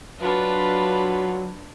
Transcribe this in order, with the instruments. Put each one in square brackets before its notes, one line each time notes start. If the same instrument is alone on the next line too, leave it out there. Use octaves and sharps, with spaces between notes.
[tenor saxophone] F#3 [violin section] D4 F4 B4